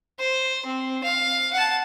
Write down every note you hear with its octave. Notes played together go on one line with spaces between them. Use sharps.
C5
C4
F5
F#5 A5